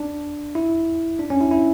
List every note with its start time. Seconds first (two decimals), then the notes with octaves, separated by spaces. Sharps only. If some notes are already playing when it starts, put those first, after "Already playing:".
Already playing: D4
0.55 E4
1.19 D4
1.30 C#4
1.41 E4
1.51 E4